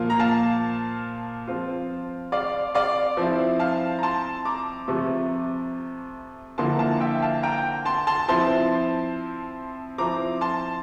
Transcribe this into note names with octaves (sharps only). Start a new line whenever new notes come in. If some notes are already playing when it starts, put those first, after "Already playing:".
Already playing: A#2 F3 A#3 F4
A#5
F5 A5
F3 C4 F4
D5 F5
D5 F5
F3 C4 E4
F5 A5
A#5
A5 C6
A#5 D6
C3 F3 A3
D3 F3 A#3 E4 A5 C6
A#5
F5 A5
E5 G5
F5 A5
G5 A#5
A5 C6
A5 C6
F3 C4 E4 A5 C6
F3 C4 E4 A#5 D6
A5 C6